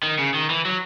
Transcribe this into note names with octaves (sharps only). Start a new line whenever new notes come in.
D#3
C#3
D#3
E3
F#3